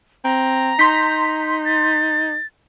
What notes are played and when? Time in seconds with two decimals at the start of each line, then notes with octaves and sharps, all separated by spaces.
0.24 C4 A#5
0.79 D#4 C6 G6 B6
1.65 A6